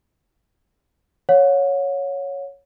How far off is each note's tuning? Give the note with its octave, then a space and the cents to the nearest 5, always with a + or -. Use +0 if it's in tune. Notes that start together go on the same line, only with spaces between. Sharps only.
C#5 +0 F#5 -40